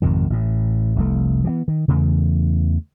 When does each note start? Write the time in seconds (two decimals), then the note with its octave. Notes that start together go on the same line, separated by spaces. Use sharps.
0.02 G#1 F2 C3 D#3
0.30 A1 A2
0.96 F1 C2 A3
1.44 E3 F3 B3
1.68 D#3
1.88 E2 C#3 E3 A3